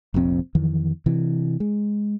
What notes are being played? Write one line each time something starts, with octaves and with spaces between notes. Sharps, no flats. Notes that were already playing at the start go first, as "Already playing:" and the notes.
F1 A#1 F2 C4
F2 D#3 E3
C3 E3
G#3